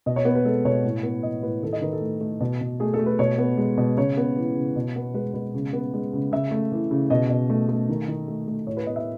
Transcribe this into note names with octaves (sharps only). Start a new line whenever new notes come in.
B2 D#5
C#5
B3
B4
G#3 A4
B2 C#5
A2
B3
E3 D#5
A2 B4
D#3 A4
D#5
D#3 B4
A4
A3
A3
B2
B2
A3 G#4
A4
A3
B4
B2 C#5
B3
G#3
B2
C#3 C#5
B3
E3
C#3
B2
B3
G#3 B4
B2 B4
C#3
B3
G#3
C#3
C#3 E5
A3
E3
C#3
B2 D#5
B2
A3
A3
D#3
D#3
A3
A3
A2 C#5
B4
B3 D#5
E5